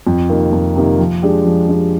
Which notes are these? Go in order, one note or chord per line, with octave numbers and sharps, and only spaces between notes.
F2
C3 D#3 A#3
F2
C3 D#3 A#3
F3
G#3 D4 G4
F3
G#3 D4 G4